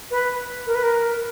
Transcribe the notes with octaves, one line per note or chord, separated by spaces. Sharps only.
B4
A#4
B4
A#4